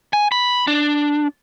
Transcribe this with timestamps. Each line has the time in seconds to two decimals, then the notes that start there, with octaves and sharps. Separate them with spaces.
0.13 G#5
0.32 B5
0.67 D4